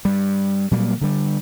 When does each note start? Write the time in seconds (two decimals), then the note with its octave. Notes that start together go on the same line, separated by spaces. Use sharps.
0.05 G2 G3
0.71 A#2 F#3 G3 A#3
1.01 D3 G3